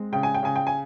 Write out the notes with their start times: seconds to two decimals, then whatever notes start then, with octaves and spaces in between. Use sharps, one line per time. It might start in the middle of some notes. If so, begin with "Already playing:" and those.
Already playing: G#3 C4
0.12 C#3 G5
0.23 G#5
0.34 G5
0.43 C#3 G#5
0.56 G5
0.67 G#5